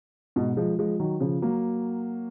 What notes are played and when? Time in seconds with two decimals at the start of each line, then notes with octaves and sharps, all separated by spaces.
0.36 G#2 B2
0.57 F3 G#3
0.79 F3 G#3
0.99 D#3 F#3
1.20 C#3 F3
1.42 F#3 A#3